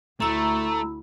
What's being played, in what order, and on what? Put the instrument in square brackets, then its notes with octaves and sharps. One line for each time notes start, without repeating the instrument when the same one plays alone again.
[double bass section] D2 [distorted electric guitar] A3 [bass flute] E4 [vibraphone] A#5 E6